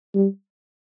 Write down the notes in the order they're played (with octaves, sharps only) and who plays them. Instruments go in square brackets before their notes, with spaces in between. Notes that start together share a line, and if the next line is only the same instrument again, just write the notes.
[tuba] G3